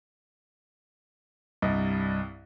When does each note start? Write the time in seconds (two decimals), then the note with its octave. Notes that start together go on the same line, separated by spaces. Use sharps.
1.62 C2 G2 D#5